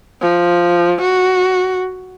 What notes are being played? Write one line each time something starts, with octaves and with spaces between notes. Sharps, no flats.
F3
F#4